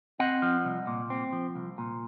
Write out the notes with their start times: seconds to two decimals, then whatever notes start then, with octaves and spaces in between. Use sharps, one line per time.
0.19 C4 D#5 F#5
0.42 F3
0.65 C2
0.87 A#2
1.10 C4
1.33 F3
1.55 C2
1.78 A#2